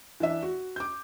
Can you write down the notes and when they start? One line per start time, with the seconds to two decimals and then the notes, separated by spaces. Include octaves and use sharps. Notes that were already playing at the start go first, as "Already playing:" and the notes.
0.20 E3 D4 E5
0.43 F#4
0.76 D6 G6